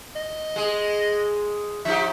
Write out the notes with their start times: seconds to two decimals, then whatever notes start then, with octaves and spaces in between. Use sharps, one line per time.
0.16 D#5
0.56 G#3 G#4
1.85 F3 D#4 G4 E5